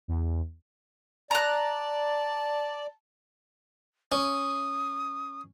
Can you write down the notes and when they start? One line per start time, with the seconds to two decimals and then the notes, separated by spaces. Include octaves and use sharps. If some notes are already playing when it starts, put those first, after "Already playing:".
0.08 E2
1.31 D5 A5 A#5 F#6
4.12 C#4 D#6